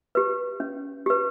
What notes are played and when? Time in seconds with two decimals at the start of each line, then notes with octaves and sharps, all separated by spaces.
0.15 G4 B4
0.60 C#4
1.06 G4 B4